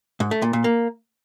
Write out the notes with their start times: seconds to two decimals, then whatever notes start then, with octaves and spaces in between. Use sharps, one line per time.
0.20 G#2
0.31 A3
0.42 A#2
0.53 A#2
0.64 A#3